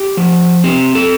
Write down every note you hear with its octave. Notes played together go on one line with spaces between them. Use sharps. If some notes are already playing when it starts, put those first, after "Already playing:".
Already playing: G4
F3
C4 G4
A4